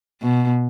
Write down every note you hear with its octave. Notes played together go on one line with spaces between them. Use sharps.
B2